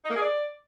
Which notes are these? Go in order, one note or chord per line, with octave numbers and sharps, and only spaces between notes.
D#4
A#3
G#4
D5